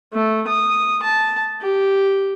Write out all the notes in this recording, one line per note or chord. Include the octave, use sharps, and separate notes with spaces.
A3
D#6
A5
G4